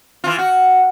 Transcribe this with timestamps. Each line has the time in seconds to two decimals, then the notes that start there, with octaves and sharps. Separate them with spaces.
0.24 E3 F4
0.38 F#4